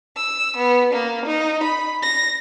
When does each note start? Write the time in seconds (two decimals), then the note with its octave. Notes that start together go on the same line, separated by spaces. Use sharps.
0.15 E6
0.56 B3
0.92 A#3
1.24 D#4
1.62 B5
2.03 A#6